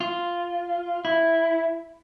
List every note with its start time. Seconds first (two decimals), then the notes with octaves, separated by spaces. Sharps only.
0.01 F4
1.05 E4